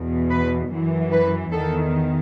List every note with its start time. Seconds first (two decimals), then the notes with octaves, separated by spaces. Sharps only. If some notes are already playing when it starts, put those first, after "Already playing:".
Already playing: E2 B2
0.30 B4
0.71 F#2 E3
1.11 B4
1.52 E2 D#3 A4